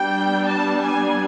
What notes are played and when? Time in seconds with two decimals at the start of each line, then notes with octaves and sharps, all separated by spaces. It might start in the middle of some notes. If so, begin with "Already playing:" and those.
Already playing: G3 B3 D4 G5
0.46 A5
0.80 G#5